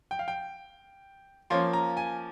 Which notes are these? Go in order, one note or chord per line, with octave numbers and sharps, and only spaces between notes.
G5
F5
G5
F3 A#3 C#4 C6
A#5
G#5